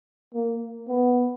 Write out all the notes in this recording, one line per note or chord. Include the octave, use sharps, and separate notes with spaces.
A#3
B3